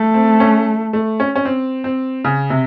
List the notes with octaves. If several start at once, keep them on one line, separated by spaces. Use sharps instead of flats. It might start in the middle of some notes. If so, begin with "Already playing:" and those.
Already playing: A3
C4
C#4
A3
C#4
C#4
C4
C4
C#3
C3